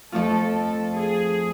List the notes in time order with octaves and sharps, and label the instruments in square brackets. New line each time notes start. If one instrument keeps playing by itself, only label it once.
[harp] F2 F3 A3 F4 [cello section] A4
[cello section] G#4